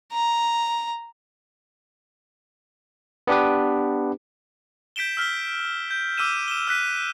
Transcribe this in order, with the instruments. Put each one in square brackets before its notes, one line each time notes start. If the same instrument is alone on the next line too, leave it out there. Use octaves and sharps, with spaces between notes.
[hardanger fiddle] A#5
[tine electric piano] B3 D4 G4 B4
[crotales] G6 B6 D7 E7 G7
E6 F6 B6 G7
G6
D6 E6 F6 D#7 E7
E7 G7
E6 F#6 B6 D#7